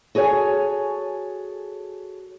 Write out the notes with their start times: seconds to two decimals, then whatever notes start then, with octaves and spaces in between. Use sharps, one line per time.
0.15 F#4 G#4 A4 C#5 G#5